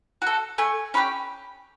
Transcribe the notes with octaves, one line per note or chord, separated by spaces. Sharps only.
F#4 A4
A3 G#5
C#4 E4 G4 B5